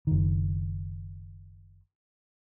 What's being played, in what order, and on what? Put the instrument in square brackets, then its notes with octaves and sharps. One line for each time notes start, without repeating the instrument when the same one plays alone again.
[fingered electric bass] F#1 D#3